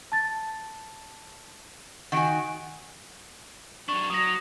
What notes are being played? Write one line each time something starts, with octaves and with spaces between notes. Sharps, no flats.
A5 A6
D#3 F#4 F#5 G#5 D7
F#3 D4 C#6
F#3 D#6 A#6